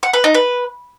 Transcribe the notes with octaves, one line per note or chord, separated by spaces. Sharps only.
F#5
B4
D#4
B4